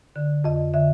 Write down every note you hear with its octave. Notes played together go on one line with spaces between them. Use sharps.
D3
F2 D#5
D3 E5